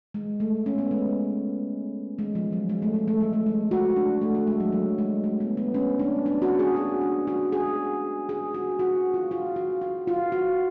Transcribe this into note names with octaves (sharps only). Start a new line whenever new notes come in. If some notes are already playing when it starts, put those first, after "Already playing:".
G#3
A3
C#4
B3
G#3
G#3
F3
F#3
G#3
A3
G#3
A3
G#3
A3
G#3
F#4
D4
A3
A3
G#3
F#3
F#3
G#3
A3
B3
B3
C#4
D4
D4
F#4
G#4
F#4
D4
F#4
G#4
G#4
F#4
F#4
F4
F4
F#4
F#4
F4
F#4